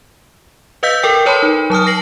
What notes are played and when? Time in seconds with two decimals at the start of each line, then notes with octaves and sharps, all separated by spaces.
0.83 B4 D#5 F5 E6 G6 B6
1.03 A4 A#4 G5
1.26 A#4 B4 C#5 A5 B5 C6
1.43 D#4
1.70 F#3 A5 D#6 F6
1.86 A5 A#6 C7 F#7